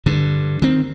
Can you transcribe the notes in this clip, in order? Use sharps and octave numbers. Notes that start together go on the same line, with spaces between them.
G2 D3
D#3 C4